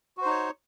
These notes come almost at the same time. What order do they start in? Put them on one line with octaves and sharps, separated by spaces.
F#4 C5 D#4 C#5